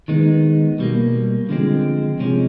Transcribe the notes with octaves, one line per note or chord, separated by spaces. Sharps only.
D#3 G#3 B3 D#4
B2 G3 A#3
D3 F3 G#3 C4
C3 F3 G#3 C#4